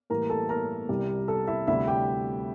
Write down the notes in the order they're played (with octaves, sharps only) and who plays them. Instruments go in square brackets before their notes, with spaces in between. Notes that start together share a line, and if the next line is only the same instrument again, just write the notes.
[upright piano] A2 E3 G3 A#3 A#4 A#5
A4 A5
A#4 A#5
C2 C3 G3
A4 A5
E4 E5
D2 C3 G3 E4 E5
G4 G5